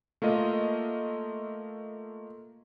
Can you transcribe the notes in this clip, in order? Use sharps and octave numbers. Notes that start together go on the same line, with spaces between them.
A3 A#3 F4 D#5